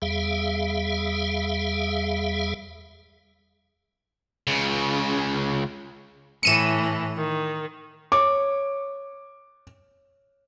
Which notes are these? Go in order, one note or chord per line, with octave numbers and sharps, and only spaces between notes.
E2 G3 G#4 E5 F5
C#2 C#3
A2 E3 C#7 D#7 E7
D#3
C#5 D6